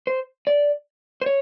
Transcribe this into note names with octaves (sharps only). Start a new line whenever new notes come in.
C5
D5
C5
C#5